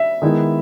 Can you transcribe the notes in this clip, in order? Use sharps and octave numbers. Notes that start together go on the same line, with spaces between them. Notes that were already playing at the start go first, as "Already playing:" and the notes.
Already playing: E5
D#3 G#3 B3 E4